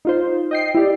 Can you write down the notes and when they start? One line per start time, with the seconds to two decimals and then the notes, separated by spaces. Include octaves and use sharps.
0.05 D#4 F4 C5
0.51 D#5 G5 C7
0.75 E4 G4 D5